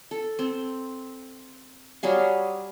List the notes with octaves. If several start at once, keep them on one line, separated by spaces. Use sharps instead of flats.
A4
C4
F#3 G3 G#4 F5